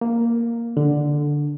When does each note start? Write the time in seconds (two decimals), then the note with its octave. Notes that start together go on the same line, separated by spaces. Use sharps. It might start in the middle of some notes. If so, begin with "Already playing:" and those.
0.01 A#3
0.77 D3